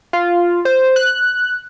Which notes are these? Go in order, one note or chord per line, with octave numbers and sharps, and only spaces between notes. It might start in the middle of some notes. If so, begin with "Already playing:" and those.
F4
C5
F#6